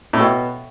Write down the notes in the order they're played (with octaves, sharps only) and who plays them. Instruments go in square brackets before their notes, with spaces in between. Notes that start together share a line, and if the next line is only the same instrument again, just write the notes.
[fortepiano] A2
[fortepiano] B2 [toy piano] A4 E5 G5 C#6